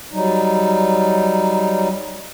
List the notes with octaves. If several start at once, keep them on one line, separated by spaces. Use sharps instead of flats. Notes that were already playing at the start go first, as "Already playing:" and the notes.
F#3 G3 D#4